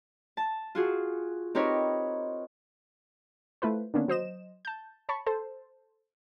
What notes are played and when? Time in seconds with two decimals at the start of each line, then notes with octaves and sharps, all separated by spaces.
0.37 A5
0.75 F4 F#4 G#4
1.55 C4 D#4 G4 A#4 B4 C#5
3.62 A3 E4 F4 B4 C5
3.94 D3 D#3 A#3 B3 C#4 D4
4.08 F#3 C5 D#5 E7
4.65 A5 G6
5.09 C#5 A5 B5 C#6
5.26 A4 C5 A5